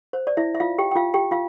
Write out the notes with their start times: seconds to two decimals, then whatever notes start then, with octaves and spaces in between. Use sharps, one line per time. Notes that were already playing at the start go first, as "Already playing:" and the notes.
0.13 C5
0.27 D5
0.37 E4 E5
0.55 E5
0.60 F4 F5
0.78 G4 G5
0.91 G5
0.95 F4 F5
1.14 G4 G5
1.31 F4 F5